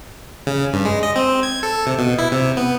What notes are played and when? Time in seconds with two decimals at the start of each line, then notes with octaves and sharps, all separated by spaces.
0.47 C#3
0.73 G2
0.86 G#3
1.03 D#5
1.16 C4
1.43 G#6
1.63 A4
1.86 C3
1.98 B2
2.19 E4
2.32 C3
2.57 B3